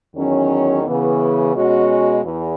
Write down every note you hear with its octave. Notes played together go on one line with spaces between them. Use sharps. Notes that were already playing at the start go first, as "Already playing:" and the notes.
E2 D#3 F#3 C#4
C#3 E3 B3
B2 G#3 C#4 F#4
E2